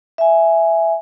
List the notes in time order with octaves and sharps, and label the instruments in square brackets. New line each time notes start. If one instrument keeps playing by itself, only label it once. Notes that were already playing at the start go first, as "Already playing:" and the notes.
[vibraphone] E5 G#5